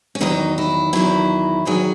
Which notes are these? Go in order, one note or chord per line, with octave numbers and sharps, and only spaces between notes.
C#4
E2 D#3 F#3 D#4
E4
E2 D#3 F#3 E4
E2 D#3 F#3 G#4